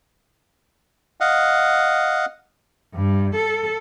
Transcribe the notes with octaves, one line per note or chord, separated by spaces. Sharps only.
D#5 F5 F#5
G2
A4